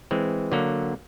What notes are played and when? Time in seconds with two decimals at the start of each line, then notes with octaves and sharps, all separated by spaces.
0.11 E3 G#3 C4
0.52 D3 F#3 A#3